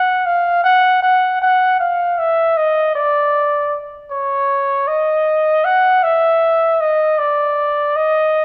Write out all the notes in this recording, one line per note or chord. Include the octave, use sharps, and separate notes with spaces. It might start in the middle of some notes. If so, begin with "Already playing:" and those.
Already playing: F#5
F5
F#5
F#5
F#5
F5
E5
D#5
D5
C#5
D#5
F#5
E5
D#5
D5
D#5